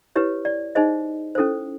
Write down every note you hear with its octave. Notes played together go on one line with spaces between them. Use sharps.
E4 G4 B4 C#5
D5
D#4 G#4 C5 D#5
C#4 E4 A4 C5